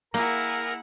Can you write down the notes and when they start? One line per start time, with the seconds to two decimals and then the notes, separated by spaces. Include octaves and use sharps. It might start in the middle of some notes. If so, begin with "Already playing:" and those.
0.14 A#3 E4 G#4 A#4 F#5